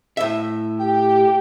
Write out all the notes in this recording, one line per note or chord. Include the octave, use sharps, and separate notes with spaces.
A2 E5
G4 G5